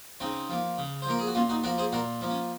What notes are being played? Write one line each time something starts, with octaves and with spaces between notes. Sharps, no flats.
C#3 C4 D#4
F3 A#3
C#3
C5
F3 A#3 A#4
G#4
F#4
A#2 C#4 F4
D#4 F#4
F3 A#3 F#4 A#4
G#4 C5
A#2 F#4 A#4
F3 A#3
C#4